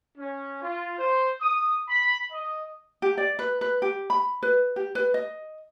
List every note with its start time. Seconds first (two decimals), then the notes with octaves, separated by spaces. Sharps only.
0.18 C#4
0.62 F4
0.98 C5
1.41 D#6
1.89 B5
2.32 D#5
3.02 G4
3.18 D5
3.39 B4
3.61 B4
3.82 G4
4.10 B5
4.43 B4
4.76 G4
4.95 B4
5.14 D#5